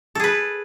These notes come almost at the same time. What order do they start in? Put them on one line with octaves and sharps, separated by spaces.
A4 G#4 B4